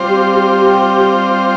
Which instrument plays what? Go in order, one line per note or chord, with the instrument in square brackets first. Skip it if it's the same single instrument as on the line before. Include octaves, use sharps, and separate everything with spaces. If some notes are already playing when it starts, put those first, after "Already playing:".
Already playing: [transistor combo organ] G3 C4 F4 C5
[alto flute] G4
G4
G4